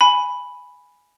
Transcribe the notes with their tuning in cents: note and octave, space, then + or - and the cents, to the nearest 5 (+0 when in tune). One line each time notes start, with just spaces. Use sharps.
G#5 +0 B5 +0